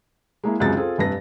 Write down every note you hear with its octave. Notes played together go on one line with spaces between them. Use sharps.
G#3 A#3 E4
C#2 F#2 C3 G#4 A6
C4 F4 G#4 A4
F1 G2 B4 A#6